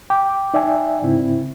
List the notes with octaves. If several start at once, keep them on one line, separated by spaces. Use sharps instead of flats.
G5 D6
D#4 D5 E5 G5 G#5
G#2 C#3 C4 E4